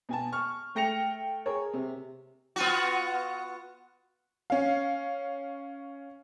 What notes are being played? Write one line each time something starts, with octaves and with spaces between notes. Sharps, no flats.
B2 G#5 A5
C#6 F6
A3 G5 A#6 C#7 F7
G#4 A#4 C#5
C3
B3 F4 F#4
C#4 F5